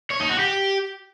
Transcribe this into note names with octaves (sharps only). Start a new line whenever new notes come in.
C#5
D#4
F#4
G4